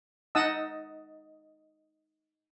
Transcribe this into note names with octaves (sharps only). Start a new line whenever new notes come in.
D#4 D#5 F#5 A5 D#6 E6